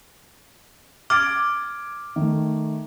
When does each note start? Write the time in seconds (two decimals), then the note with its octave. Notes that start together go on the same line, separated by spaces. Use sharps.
1.10 D6 F6 G#6 A6 D7
2.16 D#3 A3